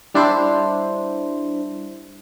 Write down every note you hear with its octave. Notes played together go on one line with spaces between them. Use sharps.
G3 D4 E4 C5